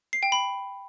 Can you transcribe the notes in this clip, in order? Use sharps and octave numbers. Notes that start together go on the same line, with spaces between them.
C7
G5
B5